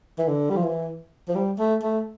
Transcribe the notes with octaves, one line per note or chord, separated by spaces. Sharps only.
E3
D3
G3
F3
E3
F3
G3
A3
A3